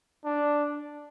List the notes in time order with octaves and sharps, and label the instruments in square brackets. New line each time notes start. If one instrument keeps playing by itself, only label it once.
[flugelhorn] D4